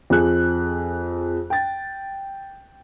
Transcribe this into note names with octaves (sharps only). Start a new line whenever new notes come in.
F2 G#4 F#6
G5 A6